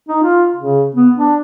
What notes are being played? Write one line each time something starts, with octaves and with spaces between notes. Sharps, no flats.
D#4
F4
C#3
B3
D4